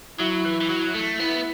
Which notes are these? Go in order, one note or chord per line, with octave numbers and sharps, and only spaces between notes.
F#3 E4
E3
E3
F#3
A3
B3 E4